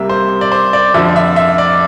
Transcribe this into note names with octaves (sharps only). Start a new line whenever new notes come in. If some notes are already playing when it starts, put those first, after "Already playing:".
Already playing: C2 C3 G3 A#3 E5
C5
D5
C5
D5
F2 D3 F3 E5
E5
E5
D5